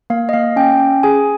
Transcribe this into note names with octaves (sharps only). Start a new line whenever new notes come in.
A#3 F5
D#5
A#3 F5
C#4 G5
C#4
G#4 G#5